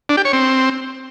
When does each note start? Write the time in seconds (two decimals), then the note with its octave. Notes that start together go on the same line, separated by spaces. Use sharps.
0.09 D4
0.17 G4
0.25 C#5
0.33 C4